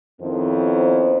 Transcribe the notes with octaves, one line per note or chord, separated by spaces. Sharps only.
F2 D#3 B3 C#4 E4 C5